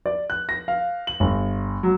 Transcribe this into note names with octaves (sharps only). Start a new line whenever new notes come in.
D5
F#6
A#6
F5
F#7
G1
F#3